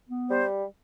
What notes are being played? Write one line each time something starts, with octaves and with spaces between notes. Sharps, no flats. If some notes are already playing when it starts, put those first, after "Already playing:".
B3
G3 C5